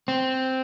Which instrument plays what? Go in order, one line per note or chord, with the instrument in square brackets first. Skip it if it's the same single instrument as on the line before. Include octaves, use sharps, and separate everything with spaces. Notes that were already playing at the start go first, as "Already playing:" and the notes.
[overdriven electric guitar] C4